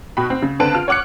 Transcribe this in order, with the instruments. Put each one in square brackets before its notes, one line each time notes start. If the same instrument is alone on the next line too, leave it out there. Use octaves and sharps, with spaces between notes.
[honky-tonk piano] B2 F#4 G5 B5
C4
C#3
C#2 D3 C4 B4 A5 D7
F4 F6
C#5 F#5 D6 F#6 C#7